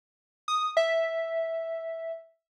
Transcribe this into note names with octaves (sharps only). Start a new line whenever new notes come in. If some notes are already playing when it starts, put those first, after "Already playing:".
D#6
E5